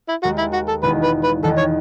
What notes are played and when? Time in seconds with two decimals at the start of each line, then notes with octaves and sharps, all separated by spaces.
0.09 E4
0.23 D#2 D#3 G#3 F#4
0.38 E4
0.53 F#4
0.68 A4
0.83 E1 E2 D#3 B4
1.03 B4
1.24 B4
1.43 E1 E2 D#3 A4
1.58 C#5